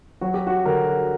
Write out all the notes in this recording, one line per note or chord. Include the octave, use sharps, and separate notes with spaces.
F#3 F#4
G4
F#4
D3 A#4